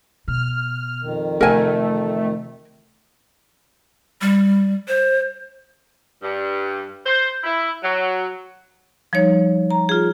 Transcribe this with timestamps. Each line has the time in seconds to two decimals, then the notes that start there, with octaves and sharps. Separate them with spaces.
0.28 B2 F6
1.02 F2 D#3
1.41 C3 E3 A3 A#4 G#5
4.21 G3
4.88 C5
6.22 G2
7.06 C5
7.43 E4
7.83 F#3
9.13 F3 G3 D#4 C#5
9.70 A#5
9.89 F4 G#4